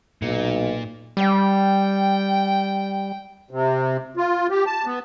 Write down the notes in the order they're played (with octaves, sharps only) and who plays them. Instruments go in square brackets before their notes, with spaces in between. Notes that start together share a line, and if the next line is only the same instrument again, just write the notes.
[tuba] B1 [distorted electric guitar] A#2
[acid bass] G3 [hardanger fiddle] G5
[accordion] C3
F4
G4
A5
B3